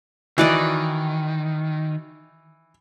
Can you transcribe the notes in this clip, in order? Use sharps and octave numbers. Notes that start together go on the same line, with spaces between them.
D#3 E3 F#4 D5 D#5